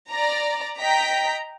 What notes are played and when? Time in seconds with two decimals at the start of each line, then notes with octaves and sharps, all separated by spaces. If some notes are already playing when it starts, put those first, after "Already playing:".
0.10 D5 A#5
0.80 D#5 G5 A#5 B6